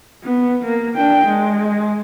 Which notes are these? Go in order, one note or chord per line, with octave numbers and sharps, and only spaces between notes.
B3
A#3
D4 G5
G#3